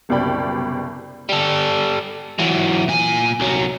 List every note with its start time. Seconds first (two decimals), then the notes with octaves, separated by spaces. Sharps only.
0.09 F#1 C2 B2 D5 G5 B5
1.29 G3 A4
2.39 E3 F#3
2.88 A#2 G#5
3.40 C2 F#3